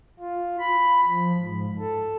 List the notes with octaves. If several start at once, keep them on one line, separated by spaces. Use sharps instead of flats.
F4
B5
F3
G#2
A4